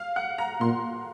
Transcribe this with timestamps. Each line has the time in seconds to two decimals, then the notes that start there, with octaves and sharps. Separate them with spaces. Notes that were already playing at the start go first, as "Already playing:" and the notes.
Already playing: F5
0.16 F#5
0.38 A#5
0.61 A#2 C6